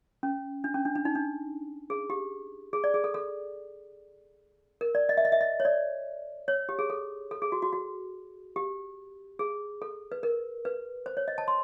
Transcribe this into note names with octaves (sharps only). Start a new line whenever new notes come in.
C#4
D4
C#4
D4
D4
D#4
D4
G#4
G4
G#4
D5
G#4
A4
A4
A#4
D5
D#5
E5
D#5
E5
D#5
C#5
D5
C#5
G4
G#4
A4
A4
G#4
F#4
F#4
F#4
G4
G#4
A4
B4
A#4
B4
C5
C#5
D#5
A5
C6